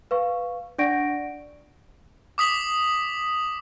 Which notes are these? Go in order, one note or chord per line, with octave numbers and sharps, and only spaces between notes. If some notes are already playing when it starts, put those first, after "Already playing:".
B4 F5 C#6
D4 D5 F#5 C#6 A#6 D7
D6 D#6 B6 F#7